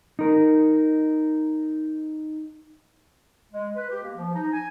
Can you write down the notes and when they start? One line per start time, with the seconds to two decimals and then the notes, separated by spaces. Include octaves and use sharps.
0.19 D#4 A#4
3.51 G#3
3.76 B4
3.90 G4
4.03 A#3
4.16 F3
4.35 D#4
4.52 G#5